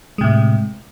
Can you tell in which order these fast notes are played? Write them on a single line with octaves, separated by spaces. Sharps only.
G#3 C3 A2